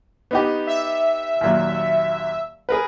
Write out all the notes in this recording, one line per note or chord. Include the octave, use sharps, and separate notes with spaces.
B3 D#4 G4
E5
D#2 A#2 F#3
G#4 A#4 B4